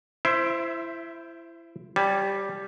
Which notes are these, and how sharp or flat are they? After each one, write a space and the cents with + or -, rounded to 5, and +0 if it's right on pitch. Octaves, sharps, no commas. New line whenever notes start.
E4 +25 C5 +0 E5 +0
G3 +0 C#5 -25 A5 -45